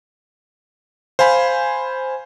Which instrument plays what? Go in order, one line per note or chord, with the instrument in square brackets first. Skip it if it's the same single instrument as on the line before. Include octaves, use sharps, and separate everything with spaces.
[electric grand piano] C5 F5 G#5 B5